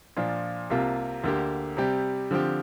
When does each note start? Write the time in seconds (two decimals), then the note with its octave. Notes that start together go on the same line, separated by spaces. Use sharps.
0.17 A#2 F3 D4 F4
0.70 C2 C3 A#3 F4
1.24 D2 D3 A#3 G4
1.77 C3 G3 C4 G4
2.31 D3 F3 C4 G4